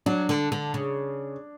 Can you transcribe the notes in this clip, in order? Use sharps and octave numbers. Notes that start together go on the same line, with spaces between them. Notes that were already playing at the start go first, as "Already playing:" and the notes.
F#3 D4
D3
D3
C#3